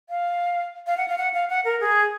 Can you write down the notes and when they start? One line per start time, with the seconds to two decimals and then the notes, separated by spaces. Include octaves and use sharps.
0.10 F5
0.87 F5
0.97 F#5
1.08 F5
1.18 F#5
1.34 F5
1.50 F#5
1.65 A#4
1.80 G#4